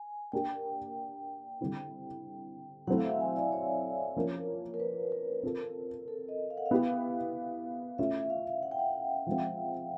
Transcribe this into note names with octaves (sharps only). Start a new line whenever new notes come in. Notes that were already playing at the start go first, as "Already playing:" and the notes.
Already playing: G#5
A#3 D4 G4 G5
D3 G3 C4 E4
F#3 A3 C4 E4 F#5
F5
E5
G#5
D5
C#5
F3 A#3 C#4
A#4
B4
A#4
C4 F4 A4
A4
D#5
F5
F#5
F5
B3 E4 G4
A3 C#4 F4 E5
F5
F#5
G5
F#5
F3 G#3 C4